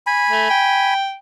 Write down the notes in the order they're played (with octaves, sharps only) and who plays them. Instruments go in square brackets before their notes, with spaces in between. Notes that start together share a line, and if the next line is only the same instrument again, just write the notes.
[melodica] G#5 B5
[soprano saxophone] A3
G5